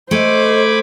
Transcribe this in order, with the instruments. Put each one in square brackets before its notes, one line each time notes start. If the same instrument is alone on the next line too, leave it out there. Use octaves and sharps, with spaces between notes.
[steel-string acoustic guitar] A3 [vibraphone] A4 D#5 [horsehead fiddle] C5 [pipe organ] G#5 B5 D6